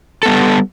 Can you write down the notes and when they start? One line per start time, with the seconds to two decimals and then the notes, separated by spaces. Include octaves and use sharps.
0.23 A4
0.26 B3
0.28 G3